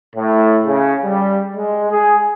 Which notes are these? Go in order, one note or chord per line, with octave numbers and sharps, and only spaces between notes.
A2
C#3
G3
G#3
G#4